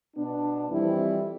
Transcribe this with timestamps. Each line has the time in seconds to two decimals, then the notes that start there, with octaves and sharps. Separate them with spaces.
0.16 B2 B3 D4
0.70 F2 E3 G3 C4 E4